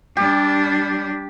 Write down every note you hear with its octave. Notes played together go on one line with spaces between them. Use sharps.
G3 D4 G4